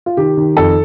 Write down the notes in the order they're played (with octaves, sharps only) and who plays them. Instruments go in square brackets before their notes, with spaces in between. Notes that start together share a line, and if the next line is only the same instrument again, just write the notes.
[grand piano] F4
D#3 G4
D#3
F2 A4